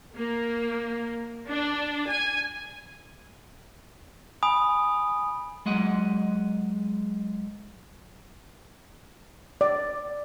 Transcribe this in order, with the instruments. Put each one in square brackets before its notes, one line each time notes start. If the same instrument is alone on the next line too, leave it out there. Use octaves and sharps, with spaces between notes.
[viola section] A#3
D4
G#5
[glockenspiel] G#5 B5 D#6
[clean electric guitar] F#3 G#3 D#5 F#5
[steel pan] D5